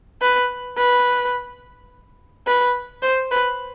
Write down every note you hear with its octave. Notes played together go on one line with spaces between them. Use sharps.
B4
B4
B4
C5
B4